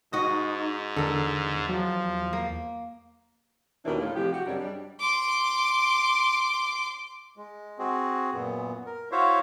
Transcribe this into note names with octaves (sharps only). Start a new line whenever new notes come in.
G#2 D#4 F#4 D#5
E2 D3 A4 A#4
F3 F#3
A#3
D#2 B2 D#3 E3 C#4 D4
A2 F4
C3 E3 F3 G#3 G4
F#4 G4
F#2 C#3 G3 G#3 C4 D4
G3 D4
C6 D6
G#3
C4 F#4 G#4
F#2 A#2 B3
A#4
E4 F#4 C5 C#5 E5 F5